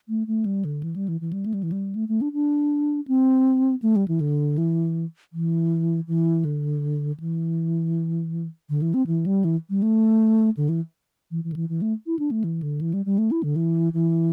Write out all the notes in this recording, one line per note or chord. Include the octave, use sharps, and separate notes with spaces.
A3
A3
G3
D3
E3
G3
E3
E3
G3
A3
G3
E3
G3
A3
A3
D4
D4
C4
A3
G3
E3
D3
E3
E3
E3
D3
E3
D3
E3
C4
E3
G3
E3
G3
A3
D3
E3
E3
E3
D3
E3
E3
A3
E4
D4
A3
E3
D3
E3
G3
G3
A3
E4
D3
E3
E3